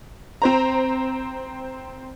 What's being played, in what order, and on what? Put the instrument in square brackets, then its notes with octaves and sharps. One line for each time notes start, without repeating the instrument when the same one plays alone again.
[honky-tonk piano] C4 C5 A#5